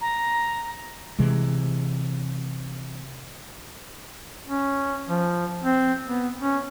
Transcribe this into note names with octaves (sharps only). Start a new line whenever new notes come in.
A#5
C3 E3 G#3
C#4
F3
C4
B3
C#4